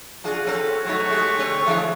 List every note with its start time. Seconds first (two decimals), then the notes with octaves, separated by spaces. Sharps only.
0.24 D4 F4 F#4 G#4
0.45 C4 C#4 A4
0.85 F#3 A3 D#4 C#5
1.09 G#3 G4
1.36 D3 C4 C#6
1.65 D3 E3 G#3